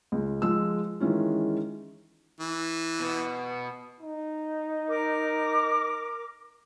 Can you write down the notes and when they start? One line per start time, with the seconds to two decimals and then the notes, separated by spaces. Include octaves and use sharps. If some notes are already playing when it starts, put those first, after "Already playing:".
0.12 C#2
0.42 F3 G#3 E6
1.00 D#3 E3 G#3 C#4 F4
2.40 E3
3.00 B2 B3
4.01 D#4
4.87 A#4 D6